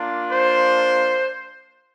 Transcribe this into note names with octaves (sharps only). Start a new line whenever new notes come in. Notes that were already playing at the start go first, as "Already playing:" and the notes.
Already playing: A#3 D4 F4
C5